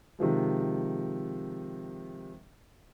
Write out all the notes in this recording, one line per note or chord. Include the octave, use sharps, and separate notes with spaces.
C3 D#3 F3 G#3